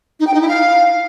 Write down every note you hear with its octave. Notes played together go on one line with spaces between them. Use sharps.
D#4
G5
D#4
E4
F5